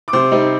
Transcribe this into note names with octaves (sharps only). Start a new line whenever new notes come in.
D6
C3 C5 C6
G3 C4 D#4